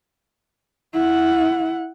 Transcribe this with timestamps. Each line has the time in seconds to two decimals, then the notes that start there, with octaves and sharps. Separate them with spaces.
0.94 E4 F#5